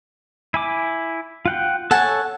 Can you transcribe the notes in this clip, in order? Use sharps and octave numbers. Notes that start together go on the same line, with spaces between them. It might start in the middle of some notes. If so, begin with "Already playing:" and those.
E4 G#5 D6
F4 F#5 G5
A4 C#5 F#5 G#5 A5